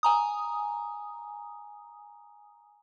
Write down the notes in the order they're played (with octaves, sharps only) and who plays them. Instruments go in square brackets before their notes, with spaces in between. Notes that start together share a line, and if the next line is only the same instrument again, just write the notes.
[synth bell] G#5 A#5 D#6